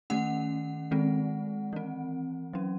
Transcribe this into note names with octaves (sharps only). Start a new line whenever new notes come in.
D#3 A3 C#4 F#5
D#3 G#3 C4
E3 C4
F#3 C#4